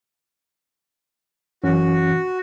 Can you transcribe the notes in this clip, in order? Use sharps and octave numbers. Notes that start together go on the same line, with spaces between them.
F#2 E3 C#4 F#4